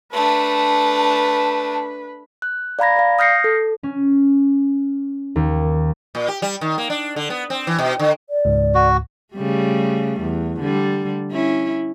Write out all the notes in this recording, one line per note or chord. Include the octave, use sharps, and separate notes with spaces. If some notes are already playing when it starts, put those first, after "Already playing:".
A3 D4 B4 A5
F#6
D5 F5 A#5 B5 G#6 A#6
D5 F5
D#6 F6 G6 A#6 C7 C#7
A4
C#4
D#2
A#2
G4
G3
D#3
A#3
D4
D3
B3
C4
E3
B2
D3
D5
C#2 G#2
F#4
C#3 G3 A3
E2
D3 G3
C#4 E4